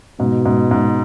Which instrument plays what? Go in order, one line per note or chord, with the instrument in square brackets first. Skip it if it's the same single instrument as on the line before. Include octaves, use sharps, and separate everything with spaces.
[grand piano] G#2 [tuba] B2
[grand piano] G#2
G#2